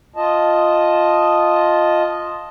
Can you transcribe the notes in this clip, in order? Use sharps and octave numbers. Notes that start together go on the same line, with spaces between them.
F4 D#5 A5